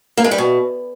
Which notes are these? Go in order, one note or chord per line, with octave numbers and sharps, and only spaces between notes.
A#3
G#3
G3
B2